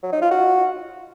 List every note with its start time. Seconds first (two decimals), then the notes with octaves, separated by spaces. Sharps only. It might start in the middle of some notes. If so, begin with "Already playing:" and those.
0.03 F#3
0.12 D#4
0.22 F4
0.31 F#4